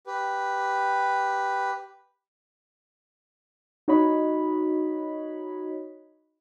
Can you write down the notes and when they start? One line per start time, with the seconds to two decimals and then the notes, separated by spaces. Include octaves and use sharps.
0.07 G4 B4
3.88 D#4 F#4 C#5 D#5 B5